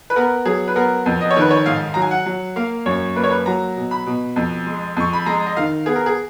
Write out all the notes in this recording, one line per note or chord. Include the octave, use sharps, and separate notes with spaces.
B4
B3 A#4
F#3 G#4
B4
B3 A#4
F2
D#5
C#5
D#3 B4
C#5
G#2 F5
F#3 A#5
G#5
F#5
F#3
A#3 F5
F#2 C#5
A#3 B4
C#5
B4
F#3 A#5
B2
B5
B2
F2
G#3
F2 C#6
B5
G#3 A#5
D#5
D#3 F5
B3 G#4
A#4
G#4